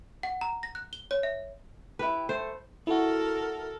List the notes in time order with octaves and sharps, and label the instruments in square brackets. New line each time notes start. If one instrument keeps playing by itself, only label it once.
[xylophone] F#5
A#5
A#6
F#6
G7
C#5
E5
[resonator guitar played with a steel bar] E4 G4 [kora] B4
[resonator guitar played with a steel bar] A3 [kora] C5
[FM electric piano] E4 F#4 [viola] A4 A#4